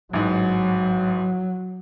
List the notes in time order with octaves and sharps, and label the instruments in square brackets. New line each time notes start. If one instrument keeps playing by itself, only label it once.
[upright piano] A1 G#2 [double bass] F#3